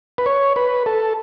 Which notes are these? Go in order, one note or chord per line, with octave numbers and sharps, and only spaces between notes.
B4
C#5
B4
A4